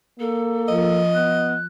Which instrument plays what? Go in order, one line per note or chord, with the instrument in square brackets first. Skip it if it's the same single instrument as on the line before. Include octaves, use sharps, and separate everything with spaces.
[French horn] A#3 [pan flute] A4
[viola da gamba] F3 F4 [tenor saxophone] D#5
[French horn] B3 [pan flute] F#6